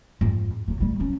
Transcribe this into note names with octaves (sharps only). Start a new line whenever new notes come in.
F2 G#2
E3 F#3
G3 A3
F#3 C#4